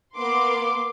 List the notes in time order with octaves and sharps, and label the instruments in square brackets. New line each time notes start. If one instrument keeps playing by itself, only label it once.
[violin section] A#3 B3 C6 D6